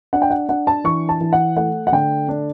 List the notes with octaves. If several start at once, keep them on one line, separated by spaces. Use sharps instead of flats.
D4 F#5
G5
F#5
D4 F#5
A5
E3 C#6
A5
E3
F#5
A3 F#5
F#5
D3 G5
D4